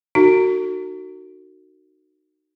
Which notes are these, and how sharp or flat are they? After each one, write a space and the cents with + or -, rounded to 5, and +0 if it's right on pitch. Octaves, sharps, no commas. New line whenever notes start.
D#4 -30 F#4 +0 A4 +45